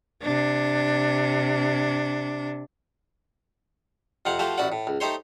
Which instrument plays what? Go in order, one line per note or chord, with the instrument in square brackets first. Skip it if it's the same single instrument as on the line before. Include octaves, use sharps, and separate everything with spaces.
[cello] C3 D4
[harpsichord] F2 C3 C4 F5 F#5
F3 A3 F#4 G4 C5 F5
A1 C#4 E4 F#4 D5 F#5
A2
C#2
A3 D#4 G4 C5 C#5 C6